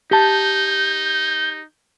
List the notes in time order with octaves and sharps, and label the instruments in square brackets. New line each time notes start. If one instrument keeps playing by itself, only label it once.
[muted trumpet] D#4 [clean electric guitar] G4 A5 [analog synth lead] G6